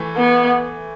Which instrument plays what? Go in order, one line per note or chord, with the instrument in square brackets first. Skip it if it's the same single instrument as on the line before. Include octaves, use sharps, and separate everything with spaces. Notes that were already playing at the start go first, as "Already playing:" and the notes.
Already playing: [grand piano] E3 A3
[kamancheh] B3